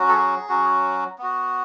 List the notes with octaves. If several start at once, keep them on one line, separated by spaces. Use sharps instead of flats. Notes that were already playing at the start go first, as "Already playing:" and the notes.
Already playing: F#3 C#4 F#4
A4
G#4
F#3 C#4 F#4
B3 F#4